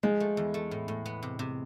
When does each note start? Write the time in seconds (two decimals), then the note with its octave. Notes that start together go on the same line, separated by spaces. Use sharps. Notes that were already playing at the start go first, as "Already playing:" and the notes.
0.03 F3 G#3
0.20 A3
0.37 E2
0.54 A3
0.71 A2
0.88 A2
1.06 B3
1.23 C3
1.39 C3